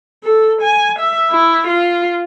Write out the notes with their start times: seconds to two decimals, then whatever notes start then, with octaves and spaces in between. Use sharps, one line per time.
0.24 A4
0.62 G#5
0.99 E5
1.31 E4
1.68 F4